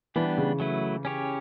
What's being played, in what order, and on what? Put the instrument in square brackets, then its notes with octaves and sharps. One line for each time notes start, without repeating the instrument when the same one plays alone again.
[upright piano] E3 [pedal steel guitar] G3 B3 D4 G4
[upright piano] C#3
[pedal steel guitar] F#3 A3 E4 B4
C#4 G4 C#5